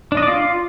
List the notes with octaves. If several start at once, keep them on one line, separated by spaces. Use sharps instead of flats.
D4
D#5
D5
F4